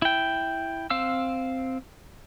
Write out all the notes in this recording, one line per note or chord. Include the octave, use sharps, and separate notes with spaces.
E4 G5
C4 F5 E6